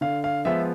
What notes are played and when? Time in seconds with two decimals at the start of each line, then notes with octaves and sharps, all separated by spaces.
0.01 D3 F5
0.24 F5
0.45 F3 G#3 B3 E5